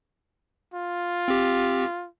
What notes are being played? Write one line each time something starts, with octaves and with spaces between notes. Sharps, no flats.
F4
C4 G4